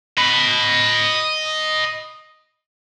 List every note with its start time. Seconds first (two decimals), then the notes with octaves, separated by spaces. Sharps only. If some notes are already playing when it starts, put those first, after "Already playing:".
0.18 D#5 B5